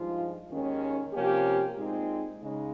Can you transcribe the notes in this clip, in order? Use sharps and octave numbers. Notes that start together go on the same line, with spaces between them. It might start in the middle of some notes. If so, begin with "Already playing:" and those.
Already playing: G2 F3 G#3 D#4 F4
D#2 D#3 G#3 C#4
C3 F3 A#3 C#4 G4
A#2 G#3 C4 D#4
C#3 G#3 D#4